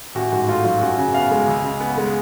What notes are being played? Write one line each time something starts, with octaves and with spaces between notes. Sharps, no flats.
A1 F#4
G#2 F#4
A3 F4
F#3 F4
F#2 F#4
C#3
B3 F5
G#3
C#2
C#3
B3
G#3